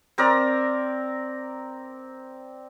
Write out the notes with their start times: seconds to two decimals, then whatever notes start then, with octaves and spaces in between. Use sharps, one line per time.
0.18 C4 A#4 D5 A#5